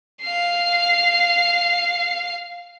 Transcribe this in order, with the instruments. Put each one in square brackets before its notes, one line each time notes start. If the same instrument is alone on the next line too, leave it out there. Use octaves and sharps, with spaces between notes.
[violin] F5 C7